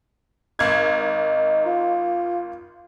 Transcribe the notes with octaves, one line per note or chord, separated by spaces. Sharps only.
G#1 D#4 G#6
D#4
F4